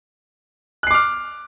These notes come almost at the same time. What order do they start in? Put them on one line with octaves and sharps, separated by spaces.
F#6 C7 D6 F6